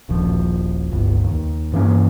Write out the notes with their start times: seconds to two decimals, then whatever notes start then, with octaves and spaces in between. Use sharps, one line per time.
0.09 D#1 A#1 F3
0.92 G1 C#2
1.24 D#2
1.72 G2 E3 A#3 C#4